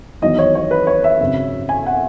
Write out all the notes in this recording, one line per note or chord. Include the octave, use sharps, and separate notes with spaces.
E2 D#3 F#3 D#5
C#5
C#5
B4
C#5
E5
G#1 F#2 C#3
G#5
F#5